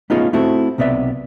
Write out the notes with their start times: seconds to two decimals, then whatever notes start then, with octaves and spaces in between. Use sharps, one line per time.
0.10 A3 B3 C#4 D#4 F4 G#4
0.33 A3 C4 E4 F#4 A4
0.78 B1 C3 B3 D5 E5